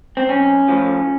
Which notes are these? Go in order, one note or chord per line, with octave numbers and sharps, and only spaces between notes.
C4
B1 C#4
A2 F3